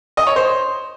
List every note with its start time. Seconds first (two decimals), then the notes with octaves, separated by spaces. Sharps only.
0.17 D#5
0.27 C#5
0.36 C5